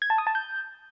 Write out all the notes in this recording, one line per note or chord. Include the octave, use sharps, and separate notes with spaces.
G#6
A5
D#6
A5
G6